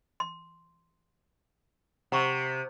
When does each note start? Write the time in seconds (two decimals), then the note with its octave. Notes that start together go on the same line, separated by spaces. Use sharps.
0.20 C6
2.12 C3 F#5 A#5 C#6